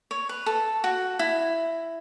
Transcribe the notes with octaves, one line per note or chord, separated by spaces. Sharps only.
C#5
B4
A4
F#4
E4